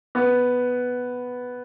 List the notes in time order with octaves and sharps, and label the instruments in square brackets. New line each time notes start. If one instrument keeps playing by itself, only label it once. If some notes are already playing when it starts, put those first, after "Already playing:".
[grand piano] B3